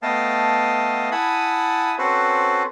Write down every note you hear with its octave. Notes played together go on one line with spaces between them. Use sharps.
A3 B3 D#5 F5 G5 A5
E4 F#5 G#5 A5 B5 D#6
C4 C#4 F#4 A4 B4 C5